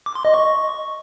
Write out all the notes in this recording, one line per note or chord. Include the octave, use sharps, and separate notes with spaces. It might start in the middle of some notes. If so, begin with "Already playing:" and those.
D6
C6
D#5
C#6